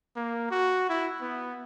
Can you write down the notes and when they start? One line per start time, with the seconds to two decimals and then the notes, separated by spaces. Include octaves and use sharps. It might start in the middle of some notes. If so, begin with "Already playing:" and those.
0.16 A#3
0.51 F#4
0.89 E4
1.21 B3